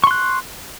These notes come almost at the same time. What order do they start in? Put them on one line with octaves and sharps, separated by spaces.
C#6 C6 F#6